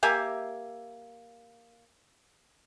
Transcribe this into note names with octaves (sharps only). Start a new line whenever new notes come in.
A#3 G4 E5 G#5